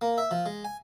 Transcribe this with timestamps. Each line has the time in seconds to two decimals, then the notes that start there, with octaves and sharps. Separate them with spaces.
0.01 A#3
0.18 E5
0.31 F3
0.46 G#3
0.65 G#5